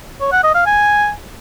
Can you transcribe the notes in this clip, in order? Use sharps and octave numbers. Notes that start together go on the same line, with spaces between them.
C#5
F#5
D#5
F5
G#5